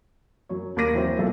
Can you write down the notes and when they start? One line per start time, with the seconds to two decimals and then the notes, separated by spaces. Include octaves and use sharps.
0.49 F#2 F#3 C#5
0.76 D#2 A#4 D6 A#6 D#7
0.94 E3 F#3 C4 E4 F#4 C5
1.18 B1 A#2 A4